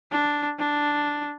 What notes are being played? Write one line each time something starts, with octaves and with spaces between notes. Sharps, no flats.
D4
D4